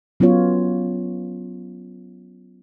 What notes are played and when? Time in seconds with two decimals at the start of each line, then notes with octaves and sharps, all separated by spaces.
0.20 F#3 B3 C#4 F4 C#5